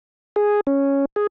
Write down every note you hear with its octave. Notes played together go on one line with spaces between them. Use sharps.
G#4
C#4
G#4